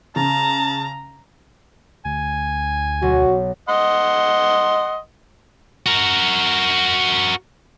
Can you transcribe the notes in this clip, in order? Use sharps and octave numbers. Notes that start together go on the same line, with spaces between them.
C#3 A5 A#5
D2 G#5
B1 F#4
D#5 F#5 C6
F#4 A#4